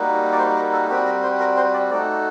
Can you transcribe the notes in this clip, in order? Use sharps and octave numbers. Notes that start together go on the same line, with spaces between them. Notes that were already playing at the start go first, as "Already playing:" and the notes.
Already playing: G3 A#3 D#4 F#4
D5
C5
A#4
A4
G3 C4 F#4 G4
A#4
C5
A#4
C5
D5
A3 D#4 F#4 D5